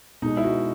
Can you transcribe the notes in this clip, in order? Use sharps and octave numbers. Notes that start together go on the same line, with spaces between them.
B2 G#3 D#4
E4
F#4